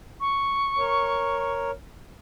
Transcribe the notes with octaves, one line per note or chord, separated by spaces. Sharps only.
C#6
A#4 C#5